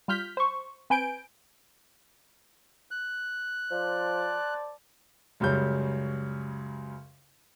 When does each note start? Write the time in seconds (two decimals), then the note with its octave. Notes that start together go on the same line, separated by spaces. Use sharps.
0.08 G3 F4 F6 G6 B6
0.37 C5 C#6
0.90 C4 B4 G#5 G6 D7
2.91 F#6
3.71 F3 C5 D5 A5
5.40 C#2 F#2 C#3 G3 C#4 G6